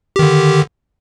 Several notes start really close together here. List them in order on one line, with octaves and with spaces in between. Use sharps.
G4 D#3 D3